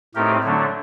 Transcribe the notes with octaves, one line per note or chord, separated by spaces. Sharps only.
A2 A3 C4 D#4 G4 A#4
D3 F#3 A3 D4